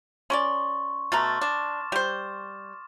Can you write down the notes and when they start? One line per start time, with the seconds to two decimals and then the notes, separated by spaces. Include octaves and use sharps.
0.30 C#4 A#4 D5 C6 C#6
1.12 B2 A3 A#5 C6 F6 A6
1.41 D4 D6 E7
1.92 G3 C5